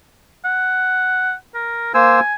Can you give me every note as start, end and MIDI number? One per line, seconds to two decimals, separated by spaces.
0.45 1.34 78
1.54 1.92 70
1.94 2.20 58
1.94 2.20 72
1.94 2.35 80
1.94 2.20 88